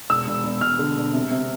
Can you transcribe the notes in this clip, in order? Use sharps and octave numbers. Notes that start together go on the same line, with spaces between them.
E1 E6
E1
E1
E1 F6
D3
E1
C3
C3